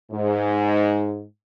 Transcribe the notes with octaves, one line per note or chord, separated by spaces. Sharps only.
G#2